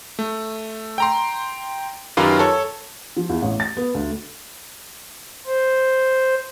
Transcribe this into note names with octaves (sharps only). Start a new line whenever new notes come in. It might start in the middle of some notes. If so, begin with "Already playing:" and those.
A3
G5 A#5 C6
F#2 D#3 F4 G4 B4 F5
A4 C#5
F3
E2
A1
A6
B3
D2
C5